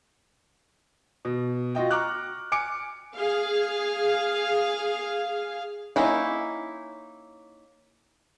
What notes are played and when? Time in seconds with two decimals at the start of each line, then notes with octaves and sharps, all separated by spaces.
1.25 B2
1.75 F4 F#4 D#5 G5
1.91 A#5 C#6 D6 F6 F#6
2.52 G#5 D6 C#7 D7
3.17 G#4 F5
5.96 A#3 C#4 D#4 E4